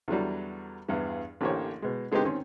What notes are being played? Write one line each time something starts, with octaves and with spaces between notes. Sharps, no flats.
E2 D3 F#3 G3
E2 G2 E3
A1 D3 A#3 G4 C5 C#5
B2 G#3
D3 G#3 B3 C4 D#4 G4
D#3 C4 C#4